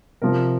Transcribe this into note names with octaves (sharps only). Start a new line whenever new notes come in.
C3 F3 A#4